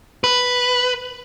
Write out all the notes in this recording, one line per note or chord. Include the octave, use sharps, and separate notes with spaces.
B4